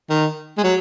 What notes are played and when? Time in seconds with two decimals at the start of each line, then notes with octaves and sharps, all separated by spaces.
0.10 D#3
0.58 G#3
0.64 F#3